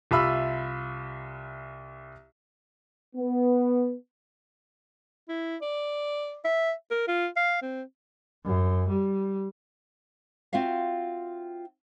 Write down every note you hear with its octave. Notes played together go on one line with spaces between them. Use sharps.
C2 F4 E5 B5 E6
B3
E4
D5
E5
A#4
F4
F5
C4
F#2
G3
C4 F4 F#4 E5 F5